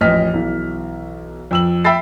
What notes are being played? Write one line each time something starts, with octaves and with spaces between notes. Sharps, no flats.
A1 F2 D#5 F6 B6
B1 E3
F2 E6 F#7
E5 G5 B5 E6 A6 C7